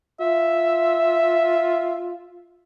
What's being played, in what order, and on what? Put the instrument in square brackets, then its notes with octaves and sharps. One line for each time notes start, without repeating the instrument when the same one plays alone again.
[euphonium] F4 [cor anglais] E5